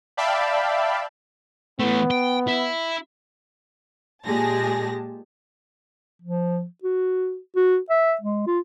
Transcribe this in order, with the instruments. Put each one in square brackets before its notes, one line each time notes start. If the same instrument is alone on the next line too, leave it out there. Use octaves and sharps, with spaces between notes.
[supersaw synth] D5 E5 F5 G5 A5 B5
[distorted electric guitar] E3 A3 [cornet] B3
[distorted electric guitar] G5
E4
[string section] A#2 G#3 G4 G#4 A5 A#6
[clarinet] F3
F#4
F#4
E5
G#3
F4